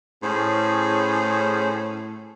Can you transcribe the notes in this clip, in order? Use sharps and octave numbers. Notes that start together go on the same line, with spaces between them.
A2 C#4 G#4 C5